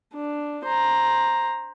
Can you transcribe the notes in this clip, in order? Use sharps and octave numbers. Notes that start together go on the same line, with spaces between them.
D4
C5 A#5